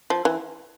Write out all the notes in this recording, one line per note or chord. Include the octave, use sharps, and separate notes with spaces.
F3
E3